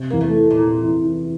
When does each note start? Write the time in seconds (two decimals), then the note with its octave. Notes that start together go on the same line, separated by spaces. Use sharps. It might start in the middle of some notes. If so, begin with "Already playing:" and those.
Already playing: C3
0.10 E2 A#3
0.21 A3
0.35 E3
0.50 A#2
0.58 E3
0.82 E3
1.04 E3